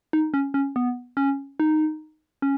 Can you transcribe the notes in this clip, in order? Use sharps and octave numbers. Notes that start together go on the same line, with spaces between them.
D#4
C#4
C#4
B3
C#4
D#4
C#4